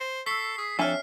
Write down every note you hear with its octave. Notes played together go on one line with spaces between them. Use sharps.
C5
A4 C#6 E6 B6 C7
G#4
F2 D4 A4 C#5 E5 G#5 F6 B6